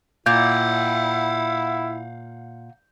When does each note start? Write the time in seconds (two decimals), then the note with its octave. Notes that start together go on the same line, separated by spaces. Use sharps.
0.26 A#2 E4 F5 F#5 G6